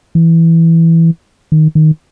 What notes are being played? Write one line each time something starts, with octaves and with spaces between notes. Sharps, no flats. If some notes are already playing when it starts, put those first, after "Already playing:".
E3
D#3
D#3